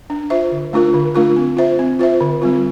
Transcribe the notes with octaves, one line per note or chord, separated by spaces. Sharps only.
D4
F4 C5 E5
D3
A3 D4 F4 A#4
D3
A3 D4 F4 A#4
C4
F4 C5 E5
C4
F4 C5 E5
D3
G3 C4 F4